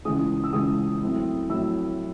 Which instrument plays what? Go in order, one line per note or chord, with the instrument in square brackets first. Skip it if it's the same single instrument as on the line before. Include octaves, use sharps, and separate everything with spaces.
[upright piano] C#2 C#3 E3 G#3 D#6
E6
C#2 C#3 E3 G#3 D#6
A2 F#3 C4 E4
A2 F#3 C4 E4 E6